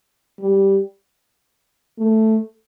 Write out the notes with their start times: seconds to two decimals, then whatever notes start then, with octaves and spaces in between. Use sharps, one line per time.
0.40 G3
1.99 A3